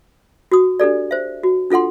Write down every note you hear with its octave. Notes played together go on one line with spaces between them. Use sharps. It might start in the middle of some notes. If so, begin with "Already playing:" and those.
F#4 D#6
D4 G4 A4 D5
C5 E5
F#4
D4 F4 A4 F#5 C6